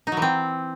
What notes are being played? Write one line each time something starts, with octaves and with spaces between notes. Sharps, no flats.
D#4
F#3
E3
C4